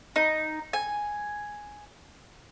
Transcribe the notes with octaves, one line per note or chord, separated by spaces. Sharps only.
D#4
G#5